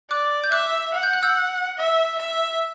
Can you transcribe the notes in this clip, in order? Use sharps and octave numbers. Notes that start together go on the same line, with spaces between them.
D5 D6 F#6
G6
E5 D6 F#6
F#5
G6
F#6
E6 G6
E5
E5